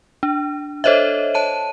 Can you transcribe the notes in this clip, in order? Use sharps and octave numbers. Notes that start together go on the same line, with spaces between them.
D4
A4 C5 C#5 D#5 E5
C#5 A5 D#7